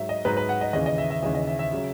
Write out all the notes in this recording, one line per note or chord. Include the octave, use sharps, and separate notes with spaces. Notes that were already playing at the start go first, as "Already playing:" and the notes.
Already playing: G#2 F#3 E5
D#5
G#2 F#3 B4
B4
F#5
D#5
D#2 C#3 E3 D#5
D#5
E5
E5
D#2 C#3 E3 D#5
D#5
E5
E5
C#3 F#3